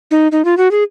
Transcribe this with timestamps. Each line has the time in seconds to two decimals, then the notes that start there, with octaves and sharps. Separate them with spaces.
0.11 D#4
0.32 D#4
0.45 F4
0.57 F#4
0.71 G#4